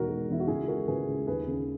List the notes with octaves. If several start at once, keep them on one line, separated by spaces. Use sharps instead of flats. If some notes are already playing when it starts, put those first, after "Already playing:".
Already playing: E1 D#3 F#4 A#4
G#3
E2 E4
F#4
C#2 E4 G#4
C#3 F#4 A#4
C#2 G#4 B4
C#2
D#2 G#4 B4
C#3